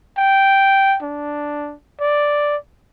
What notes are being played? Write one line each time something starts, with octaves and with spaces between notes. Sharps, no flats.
G5
D4
D5